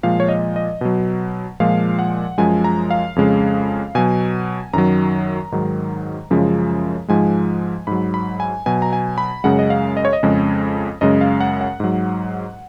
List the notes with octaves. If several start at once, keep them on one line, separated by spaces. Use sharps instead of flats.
A#2 F3 G#3 F5
C#5
D#5
D#5
B2 F#3
A#2 F3 G#3 F5
F#5
F#2 F3 G#3 G#5
A#5
F5
F2 C#3 G#3
B2 F#3 G#5
F#2 D#3 F#3 A#5
G#2 D#3 F#3
F#2 C#3 F3 G#3
G#2 F3 G#3 G#5
G#2 F#3 B5
B5
G#5
B2 F#3 G#5
A#5
G#5
B5
F#2 C#3 G#3 F#5
D#5
F5
D#5
C#5
D#5
F2 C#3 G#3
F#2 C#3 G#3 D#5
F5
F#5
F#5
G#2 F#3